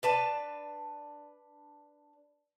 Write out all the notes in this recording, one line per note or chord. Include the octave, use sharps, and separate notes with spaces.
D4 B4 A5